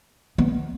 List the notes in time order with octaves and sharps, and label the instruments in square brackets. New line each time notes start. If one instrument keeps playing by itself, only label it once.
[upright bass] B3